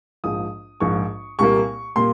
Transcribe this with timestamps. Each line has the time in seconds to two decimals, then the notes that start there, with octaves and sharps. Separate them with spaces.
0.24 A#1 G#2 F3 D#6
0.80 A#1 G#2 F3 C#6
1.39 C2 A#2 G3 A#3 C#6
1.96 A#2 G3 A#3 C6